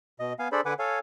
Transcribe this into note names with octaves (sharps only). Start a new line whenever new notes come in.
B2 D#5
B3 F5 G#5
D4 G#4 A4 C5 D5 B5
D3 B4 F#5 G#5 D6
A4 C#5 F5 G#5